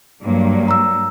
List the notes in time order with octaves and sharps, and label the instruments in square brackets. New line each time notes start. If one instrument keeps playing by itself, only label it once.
[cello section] G2 F#3 A#3
[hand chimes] A#5 E6